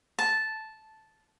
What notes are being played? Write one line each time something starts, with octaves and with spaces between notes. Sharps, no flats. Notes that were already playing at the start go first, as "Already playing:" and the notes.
A5